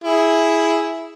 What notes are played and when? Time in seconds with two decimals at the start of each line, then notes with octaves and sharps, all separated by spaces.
0.04 E4 G#4